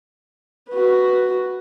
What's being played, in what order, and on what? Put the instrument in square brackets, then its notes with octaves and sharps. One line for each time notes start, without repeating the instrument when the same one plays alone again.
[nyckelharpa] F#4 B4